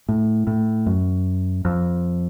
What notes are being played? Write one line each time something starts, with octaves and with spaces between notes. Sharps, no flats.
A2
A2
F#2
F2